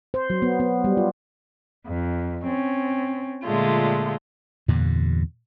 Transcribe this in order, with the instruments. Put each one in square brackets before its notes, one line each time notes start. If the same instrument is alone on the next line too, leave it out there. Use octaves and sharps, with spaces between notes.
[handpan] C5
F#3
B3
B3
G3
F4
[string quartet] F2
C4 C#4
A#2 D3 G#3 A3 F4
[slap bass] E2 G2 A#2 D3